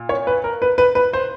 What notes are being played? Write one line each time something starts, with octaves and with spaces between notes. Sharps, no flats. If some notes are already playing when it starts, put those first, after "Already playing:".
Already playing: A#2
C#5
B4
A#4
B4
B4
B4
C5